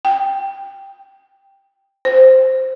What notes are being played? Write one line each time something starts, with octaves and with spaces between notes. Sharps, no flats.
G5
C5